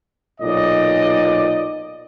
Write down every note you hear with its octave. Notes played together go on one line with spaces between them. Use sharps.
B1 A#2 D5 D#5